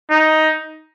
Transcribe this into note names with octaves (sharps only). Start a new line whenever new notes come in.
D#4